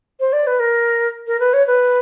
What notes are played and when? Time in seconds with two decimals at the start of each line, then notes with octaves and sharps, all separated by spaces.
0.20 C5
0.33 D5
0.47 B4
0.60 A#4
1.27 A#4
1.40 B4
1.54 C#5
1.67 B4